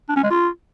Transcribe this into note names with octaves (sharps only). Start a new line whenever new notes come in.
D4
C#4
G#3
F4